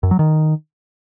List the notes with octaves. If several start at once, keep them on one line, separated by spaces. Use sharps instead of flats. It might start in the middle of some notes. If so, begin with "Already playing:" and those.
F#2
F#3
D#3